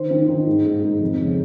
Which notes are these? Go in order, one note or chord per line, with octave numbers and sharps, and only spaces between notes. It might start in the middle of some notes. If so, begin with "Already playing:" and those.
Already playing: D#3 C5
D#3
D#3
G#2
G#2
G#2
F2
C#3